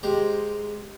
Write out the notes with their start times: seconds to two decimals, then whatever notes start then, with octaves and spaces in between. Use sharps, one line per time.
0.03 G#3 G4 C5 A#5